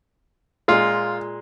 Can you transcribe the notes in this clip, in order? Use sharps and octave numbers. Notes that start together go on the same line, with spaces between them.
A#2 G#3 F4